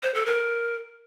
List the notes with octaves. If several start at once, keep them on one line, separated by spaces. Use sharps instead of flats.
C5
A4
A#4